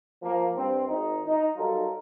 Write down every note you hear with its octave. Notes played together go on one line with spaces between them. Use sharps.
F3 A#3
G2 C4
G#1 D#4
D#4
F#3 G3 D#4 F4 A4 A#4